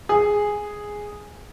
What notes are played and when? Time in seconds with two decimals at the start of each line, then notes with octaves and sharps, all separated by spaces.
0.09 G#4